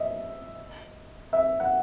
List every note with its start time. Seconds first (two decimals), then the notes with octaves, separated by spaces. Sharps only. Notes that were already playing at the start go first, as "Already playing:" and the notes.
Already playing: D#5 E5
1.33 E5
1.60 F#5